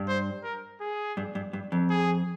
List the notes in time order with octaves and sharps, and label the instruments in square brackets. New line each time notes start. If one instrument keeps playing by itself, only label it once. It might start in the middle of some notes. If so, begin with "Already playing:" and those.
Already playing: [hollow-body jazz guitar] G2
[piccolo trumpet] C5
A#4
G#4
[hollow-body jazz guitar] G2
G2
G2
F2
[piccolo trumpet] G#4